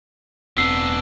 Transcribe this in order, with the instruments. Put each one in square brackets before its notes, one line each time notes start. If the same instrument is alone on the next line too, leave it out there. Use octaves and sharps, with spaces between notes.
[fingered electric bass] E1 C4 [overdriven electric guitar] B3 D4 [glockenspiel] E6 [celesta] C7